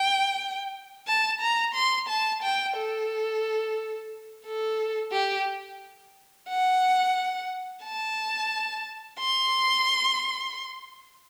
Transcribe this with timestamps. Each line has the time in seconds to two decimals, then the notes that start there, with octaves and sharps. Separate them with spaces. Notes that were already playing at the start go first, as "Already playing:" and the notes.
Already playing: G5
1.07 A5
1.41 A#5
1.75 C6
2.09 A5
2.42 G5
2.77 A4
4.45 A4
5.12 G4
6.48 F#5
7.84 A5
9.19 C6